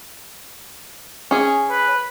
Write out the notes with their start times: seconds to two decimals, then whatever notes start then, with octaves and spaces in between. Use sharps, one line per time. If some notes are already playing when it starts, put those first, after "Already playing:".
1.31 C#4 G#4
1.70 B4